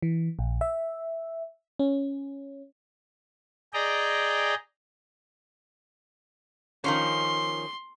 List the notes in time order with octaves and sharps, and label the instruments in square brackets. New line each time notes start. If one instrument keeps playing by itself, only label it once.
[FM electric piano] E3
A#1
E5
C#4
[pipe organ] G#4 D5 D#5 G5 A#5
[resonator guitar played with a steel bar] D#3 F3 C#4 [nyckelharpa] C6